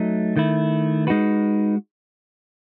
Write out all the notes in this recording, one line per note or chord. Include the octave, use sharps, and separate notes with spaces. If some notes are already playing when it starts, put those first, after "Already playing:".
Already playing: F#3 A3 D#4
D#3 A3 E4
G#3 D#4 F#4 B4